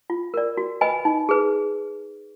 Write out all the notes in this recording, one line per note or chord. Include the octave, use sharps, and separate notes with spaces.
F4
A#4 D5
F#4
B4 D#5 G#5 B5
D#4
G#4 B4